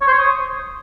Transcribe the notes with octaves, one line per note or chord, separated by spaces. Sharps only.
C#5
C5
C#5
D#6